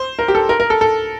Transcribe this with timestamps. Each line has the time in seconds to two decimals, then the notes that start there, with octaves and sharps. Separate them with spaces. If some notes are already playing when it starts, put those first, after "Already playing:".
Already playing: C5
0.19 A#4
0.28 G4
0.35 A4
0.49 A#4
0.60 A#4
0.70 A4
0.81 A4